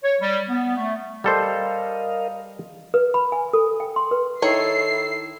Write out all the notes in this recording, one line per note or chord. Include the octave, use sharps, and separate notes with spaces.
C#5
G3
B3
A3
G3 A4 A#4 C5 D#5 F5
B4
B5
G#5
A4
G5
C6
B4
D#3 E4 A4 C#5 C7